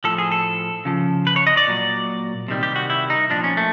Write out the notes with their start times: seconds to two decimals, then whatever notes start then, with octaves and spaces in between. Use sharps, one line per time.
0.04 A2 F3 A4
0.18 G#4
0.32 A4
0.85 C#3 F3
1.27 B4
1.36 C#5
1.47 D#5
1.57 D5
1.68 A#2 F#3
2.48 C3 D#3 G3
2.63 G4
2.76 F#4
2.90 E4
3.10 D#4
3.30 A#2 F3 D4
3.44 C#4
3.57 A3